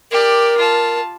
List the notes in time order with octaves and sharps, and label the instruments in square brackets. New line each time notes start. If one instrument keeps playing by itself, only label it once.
[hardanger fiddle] G4 D5 [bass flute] A#4
[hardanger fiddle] F4 A5